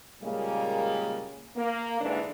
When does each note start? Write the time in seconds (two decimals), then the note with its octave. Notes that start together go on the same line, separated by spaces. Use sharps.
0.23 A#2 C#3 G3 G#3 A#3
1.56 A#3
2.01 G#2 D3 E3 D4